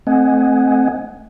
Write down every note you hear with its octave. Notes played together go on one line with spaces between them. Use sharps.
A3 C4 D#5 F#5 G#5